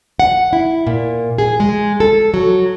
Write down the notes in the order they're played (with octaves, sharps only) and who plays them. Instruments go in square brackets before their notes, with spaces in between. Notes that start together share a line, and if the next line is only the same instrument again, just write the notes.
[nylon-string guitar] F#5
E4
A#2
G#4
G#3
A4
F#3